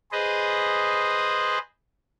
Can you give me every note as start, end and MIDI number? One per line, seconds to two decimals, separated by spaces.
0.12 1.58 68
0.12 1.58 71
0.12 1.58 72
0.12 1.58 75